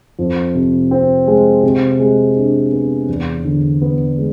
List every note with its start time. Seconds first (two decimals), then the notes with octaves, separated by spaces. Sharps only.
0.19 F2
0.55 C3
0.91 C4
1.28 G#3
1.63 C3
1.99 G#3
2.36 D4
2.72 B3
3.08 E2
3.45 D3
3.82 B3
4.18 G#3